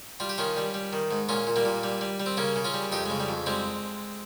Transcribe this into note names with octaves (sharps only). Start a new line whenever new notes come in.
G3 F4
G4
D#3 C#4 F4
G3
G3
D#3
G#2
A#2 C#4 F4
A#2
G3 A#3
A#2
G3
G3
G3
C4
C#3 A#3 C#4
C#3
C#4 F4
G3
F2 D#4 G4
G#3
C#3
G3
F2
G3 G#3 C4